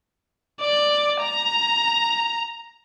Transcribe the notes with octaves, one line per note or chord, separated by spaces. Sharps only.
D5
A#5